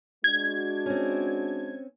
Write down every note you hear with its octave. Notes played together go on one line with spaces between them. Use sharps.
G#3 D4 F#4 G#6
C4 C#4